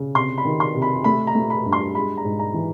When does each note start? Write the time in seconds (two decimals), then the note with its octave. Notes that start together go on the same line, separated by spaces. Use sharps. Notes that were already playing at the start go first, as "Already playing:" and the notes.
Already playing: C#3
0.15 C3 C6
0.38 B5
0.45 D#3
0.60 C6
0.74 C3
0.82 B5
1.04 A3 B5
1.27 A#5
1.35 A3
1.50 B5
1.65 G2
1.73 C6
1.95 G#3 B5
2.18 A#5
2.25 G#2
2.39 A#5
2.54 E3